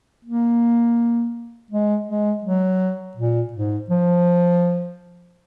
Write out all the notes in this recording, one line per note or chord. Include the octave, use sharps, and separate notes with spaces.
A#3
G#3
G#3
F#3
A#2
G#2
F3